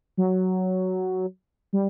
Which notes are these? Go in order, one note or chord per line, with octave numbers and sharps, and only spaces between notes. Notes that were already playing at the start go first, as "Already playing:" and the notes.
F#3
G3